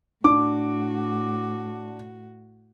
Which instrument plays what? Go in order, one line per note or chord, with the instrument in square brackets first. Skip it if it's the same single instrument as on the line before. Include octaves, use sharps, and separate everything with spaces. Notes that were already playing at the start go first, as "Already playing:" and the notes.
[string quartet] A2 F#4 [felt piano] D4 [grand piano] D6